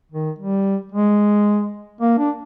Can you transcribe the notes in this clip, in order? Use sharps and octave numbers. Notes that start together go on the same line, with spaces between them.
D#3
G3
G#3
A#3
D4